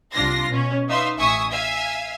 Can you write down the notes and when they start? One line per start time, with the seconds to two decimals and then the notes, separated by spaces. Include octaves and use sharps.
0.13 C2 D4 F4 C6 A#6 C7
0.48 B2 C#4
0.88 D#4 B4 E5 F5 C6
1.18 A1 E5 G#5 C#6 D#6
1.51 E5 F5 G#5